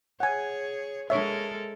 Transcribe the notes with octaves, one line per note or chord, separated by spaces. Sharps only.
G#4 C#5 F#5 G#5
G#3 A4 A#4 C#5 E5